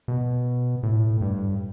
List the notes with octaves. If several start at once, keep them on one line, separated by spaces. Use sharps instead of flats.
B2
A2
G2